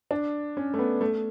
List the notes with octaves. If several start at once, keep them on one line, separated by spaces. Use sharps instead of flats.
D4
C#4
A3
B3
A3